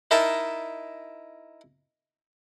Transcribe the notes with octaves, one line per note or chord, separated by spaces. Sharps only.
D#4 E4 A#4 D#5 E5 A5